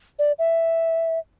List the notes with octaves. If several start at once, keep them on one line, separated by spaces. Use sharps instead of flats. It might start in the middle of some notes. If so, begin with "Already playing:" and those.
D5
E5